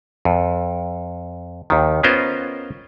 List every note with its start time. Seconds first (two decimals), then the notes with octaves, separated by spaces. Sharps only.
0.25 F2
1.70 D#2 D#3
2.03 B3 C#4 F4 A#4 C5 D#5